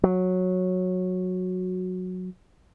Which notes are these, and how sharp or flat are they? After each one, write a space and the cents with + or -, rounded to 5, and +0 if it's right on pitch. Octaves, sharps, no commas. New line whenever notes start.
F#3 -10